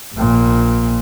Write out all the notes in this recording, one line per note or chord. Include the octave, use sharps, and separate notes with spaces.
A#1 A#2